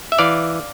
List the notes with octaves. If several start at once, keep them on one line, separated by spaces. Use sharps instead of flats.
E5
E3 D5 F5